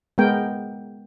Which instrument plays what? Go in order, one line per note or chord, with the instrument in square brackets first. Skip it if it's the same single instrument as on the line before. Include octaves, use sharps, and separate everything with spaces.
[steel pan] G#3 B3 A#4 G5